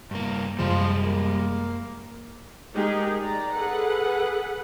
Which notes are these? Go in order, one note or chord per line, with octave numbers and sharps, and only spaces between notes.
G2 A#3
F#2 C3 E3 F3 G3 G#3
A#3
G#3 D#4 G4 G#4 A#4
D5 A#5
G#4 A4 B4 F#5